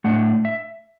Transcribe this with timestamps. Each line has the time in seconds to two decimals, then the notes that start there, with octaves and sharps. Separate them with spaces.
0.04 A2 A3 D4 F#5
0.45 E5